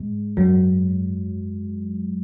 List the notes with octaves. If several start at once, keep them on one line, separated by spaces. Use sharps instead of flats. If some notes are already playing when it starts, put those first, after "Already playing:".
Already playing: G#2 G#3
F#2 F#3